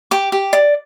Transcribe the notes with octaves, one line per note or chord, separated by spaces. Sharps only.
G4 D6
G4
D5